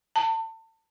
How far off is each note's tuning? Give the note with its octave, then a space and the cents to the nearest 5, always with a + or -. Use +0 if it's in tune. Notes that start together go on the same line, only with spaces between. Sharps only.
A5 +30